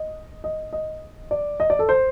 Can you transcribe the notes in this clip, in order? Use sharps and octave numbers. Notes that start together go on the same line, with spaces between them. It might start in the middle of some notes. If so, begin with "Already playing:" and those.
Already playing: D#5
D#5
D#5
D5
D#5
D5
A4
C5